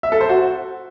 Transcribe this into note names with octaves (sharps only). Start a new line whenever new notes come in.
E5
A4
C5
F#4